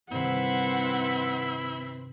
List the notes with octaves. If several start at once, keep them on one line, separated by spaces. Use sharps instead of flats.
G2 C3 D#3 C4 E4 B4 F#5